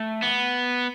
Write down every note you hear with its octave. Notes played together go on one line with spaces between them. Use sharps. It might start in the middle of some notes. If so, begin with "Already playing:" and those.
Already playing: A3
B3